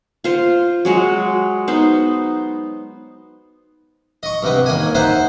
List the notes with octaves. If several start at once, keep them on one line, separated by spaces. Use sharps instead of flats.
F4 C5
F#3 G#3 F#4
B3 D#4 C5
D#5 C#6
G2 C3 B3
D#2 A#3 G#5
D#4 C5 E5 F#5